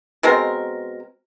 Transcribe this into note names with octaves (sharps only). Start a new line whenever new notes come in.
B2 G#3 C4 A#4